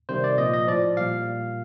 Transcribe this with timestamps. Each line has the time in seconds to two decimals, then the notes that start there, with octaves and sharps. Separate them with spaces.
0.09 C3 D#3 G3 C5
0.24 D5
0.38 A#2 F3 D#5
0.54 D#5
0.67 A2 F3 D5
0.97 A#2 G3 F5